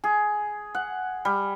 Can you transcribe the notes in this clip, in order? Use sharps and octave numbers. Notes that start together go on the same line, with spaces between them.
G#4
F#5
G3